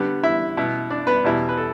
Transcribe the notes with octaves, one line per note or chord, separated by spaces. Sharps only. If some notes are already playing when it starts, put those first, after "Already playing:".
Already playing: D3 G3 B3
E4 E5
B2 B3 E4
D4 D5
B3 B4
E2 B2 G3 E4
B4
A4